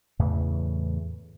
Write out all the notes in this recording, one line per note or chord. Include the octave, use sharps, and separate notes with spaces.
E2 A2 C#3 E3